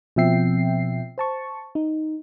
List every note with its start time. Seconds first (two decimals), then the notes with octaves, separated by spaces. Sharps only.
0.16 B2 F3 C4 E5 G5 C7
1.18 C5 A5 C#6
1.75 D#4